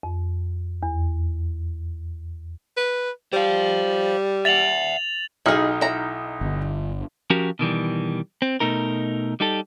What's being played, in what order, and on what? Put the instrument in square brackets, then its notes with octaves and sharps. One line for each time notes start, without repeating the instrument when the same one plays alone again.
[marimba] F2
E2
[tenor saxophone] B4
[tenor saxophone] G3 [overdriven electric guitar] C5 F5
[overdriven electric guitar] E5 F#5 [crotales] A6 F7 F#7
[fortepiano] B1 D#4 F6 [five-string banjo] E4 G#4
[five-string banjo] E4 A#5
[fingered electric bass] G1 D3
[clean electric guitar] F3 C#4 F#4 G4 A#4
B2 D#3 E3 G3
C4
B2 A3 D#4 A#4
G3 D#4 G4 A4